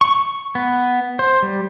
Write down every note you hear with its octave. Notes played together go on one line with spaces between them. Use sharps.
C#6
B3
C5
G3